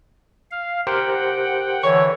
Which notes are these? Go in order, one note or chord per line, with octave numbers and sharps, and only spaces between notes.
F5
G4 A#4 C5 F#5 G5
D3 E3 C#5 C#6